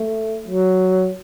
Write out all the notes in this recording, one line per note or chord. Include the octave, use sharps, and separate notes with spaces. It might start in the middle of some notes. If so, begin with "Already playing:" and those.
Already playing: A3
F#3